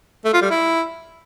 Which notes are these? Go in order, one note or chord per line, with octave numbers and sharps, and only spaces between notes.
A3
F4
G3
E4